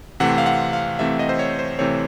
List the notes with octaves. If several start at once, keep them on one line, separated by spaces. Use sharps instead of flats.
C3 E3 A3 C4 F#5
F5
F#5
F5
C3 E3 A3 C4 E5
D#5
C5
C#5
C5
C3 E3 A3 C4 C#5